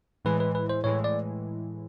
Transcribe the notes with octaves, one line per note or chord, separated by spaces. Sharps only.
A2 E3 G#3 B4
B4
B4
C5
A2 E3 G#3 C#5
D5